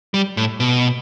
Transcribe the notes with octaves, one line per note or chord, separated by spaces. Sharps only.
G3
A2
B2